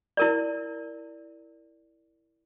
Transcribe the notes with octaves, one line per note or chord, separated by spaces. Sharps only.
E4 A#4 D5